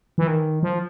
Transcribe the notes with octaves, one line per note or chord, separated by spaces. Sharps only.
E3
D#3
F3